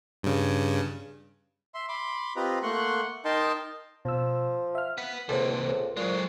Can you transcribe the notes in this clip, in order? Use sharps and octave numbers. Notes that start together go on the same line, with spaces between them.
G2 C#3
E5 C6
B5 C6 D6
C4 F4 G4 B4 D#5 A#5
A3 A#3 F#5 C6 C#6 F#6
D#4 A#4 D#5 G5 A5 C6
B2 F3 E6
E5 F5 F6
B4 F#5 B6
C#2 C3 A#3 A4 C5
C#2
A#2 F#3 G#3